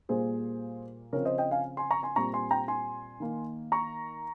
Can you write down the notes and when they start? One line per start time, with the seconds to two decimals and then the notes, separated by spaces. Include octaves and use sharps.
0.09 A#2 G3 A#3 G#4 C5
1.13 C#3 F3 C4 A#4 C#5
1.25 C5 D#5
1.38 D#5 G5
1.51 F5 G#5
1.77 G#5 C6
1.91 A#5 C#6
2.03 G#5 C6
2.16 A#2 G3 C4 A#5 C#6
2.33 G#5 C6
2.51 G5 A#5
2.68 G#5 C6
3.20 D#3 A#3
3.72 A#5 C#6